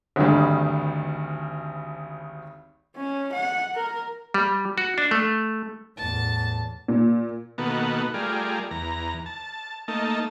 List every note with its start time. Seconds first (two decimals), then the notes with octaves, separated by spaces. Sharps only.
0.16 G#1 D2 G2 D3 D#3 G3
2.97 C#4
3.33 F#5
3.75 A#4
4.34 G3
4.78 F#4
4.98 D4
5.11 A3
5.97 E2 A2 A5
6.88 A#2
7.58 B2 D#3 A#3 B3 F#4 A4
8.14 G3 A3 F4 G#4 A#4 D5
8.71 E2 A#5
9.26 A5
9.88 A3 A#3 D#4 A5